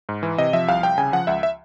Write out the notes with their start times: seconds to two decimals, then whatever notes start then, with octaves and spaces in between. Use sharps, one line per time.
0.09 G#2
0.23 E3
0.38 C3 D#5
0.53 F3 E5
0.68 C2 F5
0.83 C2 G5
0.98 C#3 G#5
1.13 F3 F#5
1.27 C#2 E5
1.43 E5